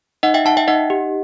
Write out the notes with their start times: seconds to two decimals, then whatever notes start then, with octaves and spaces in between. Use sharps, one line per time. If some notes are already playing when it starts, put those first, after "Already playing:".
0.23 D#4 D#5 F#5
0.34 E5 G5
0.45 D#4 F#5 A5
0.57 E5 G5
0.68 D#4 D#5 F#5
0.90 G4